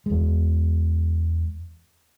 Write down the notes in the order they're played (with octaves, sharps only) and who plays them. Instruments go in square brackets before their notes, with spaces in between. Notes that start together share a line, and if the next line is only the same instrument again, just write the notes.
[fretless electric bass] E2 G#3